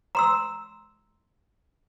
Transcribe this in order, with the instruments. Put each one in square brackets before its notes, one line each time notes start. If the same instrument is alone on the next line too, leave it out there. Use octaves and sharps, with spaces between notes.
[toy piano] A#5 C6 E6